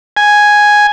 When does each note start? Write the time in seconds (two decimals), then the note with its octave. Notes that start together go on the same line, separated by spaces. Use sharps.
0.17 G#5